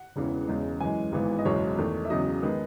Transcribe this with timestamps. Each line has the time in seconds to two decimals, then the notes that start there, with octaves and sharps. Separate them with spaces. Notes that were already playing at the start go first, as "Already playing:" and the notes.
Already playing: F#5
0.16 E1 E2 C#3 E3
0.48 E1 E2 C#3 G#3
0.80 F#2 E3 G#3 G#5
1.12 G#1 G#2 E3 B3
1.38 D#5
1.45 F#1 E2 B2 G#3 C#5
1.78 E2 D#3 A3
2.05 E5
2.10 E1 E2 C#3 F#3 D#5
2.43 D#3 G#3 B3